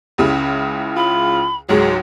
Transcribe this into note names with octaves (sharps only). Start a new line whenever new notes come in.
C#2 C#3 E4
F4 B5
C#2 G#2 F#3 G#4